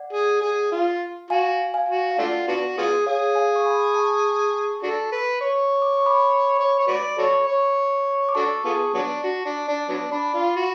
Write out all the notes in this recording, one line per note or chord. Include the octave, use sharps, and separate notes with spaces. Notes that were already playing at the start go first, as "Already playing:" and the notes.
Already playing: D5 F#5
G#4
G#4
F4
F#4 F5 G#5
F5 G#5
F#4
F5
A3 D4 F4 D5 F#5
B3 D4 F#4
B3 F4 G#4
G#4 C#5 F5
F5 G#5
C#6
G#5 B5
A5 C#6
D4 F#4 A4
B4
C#5
D6
C#6
B5 D6
C#5
C#5
F#4 B4 D5
F#4 A4 C#5
C#5
D6
D4 F#4 A4 A5 C#6
B3 F4 G#4
F#3 B3 D4
F#4
D4
D4
F#3 B3 D4
D4 B5 D6
F4
F#4